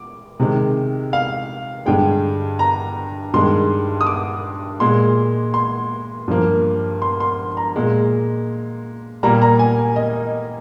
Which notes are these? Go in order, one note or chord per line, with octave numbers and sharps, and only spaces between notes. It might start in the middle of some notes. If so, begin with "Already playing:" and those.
Already playing: D6
C3 D#3 G#3
F5
G2 D3 G#3 G5
A#5
G2 D#3 G#3 C6
D#6
D6
A#2 G#3 C6
C6
G2 F3 A#3
C6
C6
A#5
A#2 G#3
A#2 G3 A#3 A#5
A#5
G#5
D#5